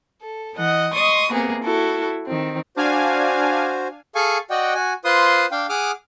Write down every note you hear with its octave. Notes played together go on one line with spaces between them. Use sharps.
A4
E3 D#5 F#5
D#5 C6 C#6 D#6
C3 A#3 B3 G#4
E4 F#4 A4
D#3 C4
D4 F#4 C5 F5 G#5
G#4 A4 F5 G#5 C#6
F#4 D5 D#5 F#5 G5
F#4 G#5
F4 B4 C5 C6 D#6
D4 F5 G5
G#4 F#5 D6 D#6 F6